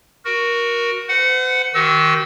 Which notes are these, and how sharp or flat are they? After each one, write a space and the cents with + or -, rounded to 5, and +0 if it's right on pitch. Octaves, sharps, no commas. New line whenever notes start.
F#4 +0 A#4 +15
C5 -45 F#5 +0
D#3 +0 F#4 +40 E6 -25